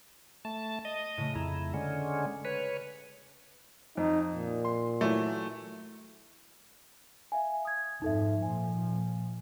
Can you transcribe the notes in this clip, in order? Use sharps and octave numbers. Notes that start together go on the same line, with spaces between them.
A3 A5
D#5
A2 C#3 A3
F2 E4 A#5
D3 G#3 C#4
B4 C#5
F2 D#4
A#2
C6
E3 F#3 A3
E5 F5 G#5
D#6 G#6
F2 G#2 D#4 A4 E5
A#2 F3 G#5